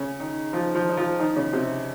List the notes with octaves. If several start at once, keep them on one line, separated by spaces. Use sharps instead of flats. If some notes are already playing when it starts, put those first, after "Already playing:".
Already playing: C#3 C#4
D#3 D#4
F3 F4
F3 F4
D#4
F3 F4
D#3 D#4
C#3 C#4
C3 C4